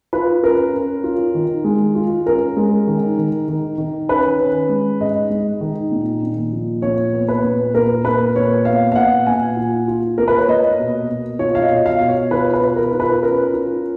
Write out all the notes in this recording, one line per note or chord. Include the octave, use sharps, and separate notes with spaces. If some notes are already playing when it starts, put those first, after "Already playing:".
F4 B4
C#4 A#4
C#4
F4
D#3
G#3
F4
C#4 A#4
G#3
D#3
D#3
D#3
D#3
C#4 B4
C#4
G#3
G#2 D#5
G#3
D#3
A#2
A#2
F3
A#2 C#5
B3
B4
A#2
A#2 A#4
A#2 B4
A#2 C#5
B3 F5
F5
A#2 F#5
A#2 G#5
F4
F4
A#3 A#4
B4
C#5
A#3 D#5
B2
B2
F4 C#5
F5
D#5
B2
F5
B2
C#5
F4 B4
B4
B2
A#4
F4
B4
C#4 A#4
F4